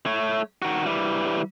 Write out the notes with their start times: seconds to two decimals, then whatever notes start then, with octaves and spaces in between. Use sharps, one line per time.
0.06 A3 C#5
0.62 D#3 F#4
0.86 E3 G3